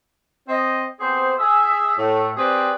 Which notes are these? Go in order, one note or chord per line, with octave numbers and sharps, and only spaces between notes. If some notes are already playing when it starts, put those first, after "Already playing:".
C4 C5 D#5
B3 C4 G4 G#4 C5
G#4 E5
A2 A3
C4 G4 G#4 B4 C5 D5